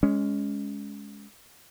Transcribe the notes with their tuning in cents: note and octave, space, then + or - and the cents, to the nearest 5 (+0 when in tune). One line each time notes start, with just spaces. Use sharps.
G#3 +0 C#4 +15